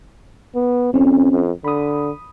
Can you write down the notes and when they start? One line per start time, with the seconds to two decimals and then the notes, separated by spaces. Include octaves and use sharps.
0.55 B3
0.94 F2 C4 C#4
1.32 F2
1.64 D3 B5 D#6